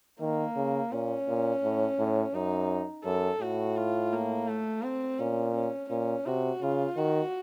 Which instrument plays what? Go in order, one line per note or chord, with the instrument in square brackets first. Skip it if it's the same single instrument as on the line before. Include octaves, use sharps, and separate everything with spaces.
[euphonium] D#3 [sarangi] A#3
[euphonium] C#3
[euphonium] A#2 [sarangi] C#4
[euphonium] A#2
A2
A2
[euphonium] F#2 [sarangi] D#4
[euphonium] F#2 [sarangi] A4
[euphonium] A2 [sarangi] F#4
[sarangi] F4
A#3
A3
C4
[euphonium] A#2 [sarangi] C#4
[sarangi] C#4
[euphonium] A#2 [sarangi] C#4
[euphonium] C3 [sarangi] F#4
[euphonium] C#3 [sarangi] F4
[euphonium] D#3 [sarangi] F#4